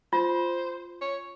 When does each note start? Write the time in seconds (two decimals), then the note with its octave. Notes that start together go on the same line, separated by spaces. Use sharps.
0.13 F4 C5
1.01 C#5